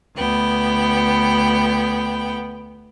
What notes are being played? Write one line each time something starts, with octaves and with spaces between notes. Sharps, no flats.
D2 B3 G5